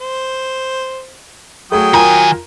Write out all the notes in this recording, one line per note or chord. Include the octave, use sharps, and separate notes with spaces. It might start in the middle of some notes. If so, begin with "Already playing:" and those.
C5
F#3 A3 G#4 G5 D#6
D#3 F4 A#4 G#5 A#5